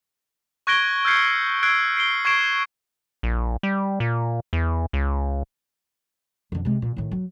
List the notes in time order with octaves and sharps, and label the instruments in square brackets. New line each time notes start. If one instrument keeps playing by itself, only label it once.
[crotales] C#6 F#6 G#6 A#6 D7 G7
E6 F6 G6 G#6 C7 C#7
E6 F#6 G#6 C7 D7
C7 D7 G7
C#6 G#6 C7 D7 E7
[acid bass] A#1
G3
A#2
E2
C#2
[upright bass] F2 D3
C3 G#3
A#2
A2 D#3
F#3